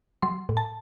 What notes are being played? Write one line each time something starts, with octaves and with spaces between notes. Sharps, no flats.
F#3 C6
A2
A5